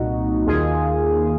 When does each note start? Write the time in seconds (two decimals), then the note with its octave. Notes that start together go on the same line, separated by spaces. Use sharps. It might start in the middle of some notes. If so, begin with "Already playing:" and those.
Already playing: C2 A#2 D#4 F#4
0.47 D#2 D#3 F4 G#4